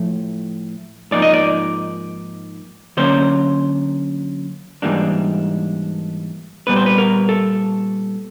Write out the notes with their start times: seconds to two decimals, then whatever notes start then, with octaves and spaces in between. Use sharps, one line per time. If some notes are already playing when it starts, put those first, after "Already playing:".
Already playing: A2 F3 A3
1.12 G#2 F3 A#3 D#4 D5
1.22 D#5
1.34 D5
2.97 D3 F#3 A#3 C#4 C5
4.82 G#2 E3 G3 A#3 D4
6.67 A#2 G3 B3 B4
6.76 C5
6.86 B4
6.98 A#4
7.29 A4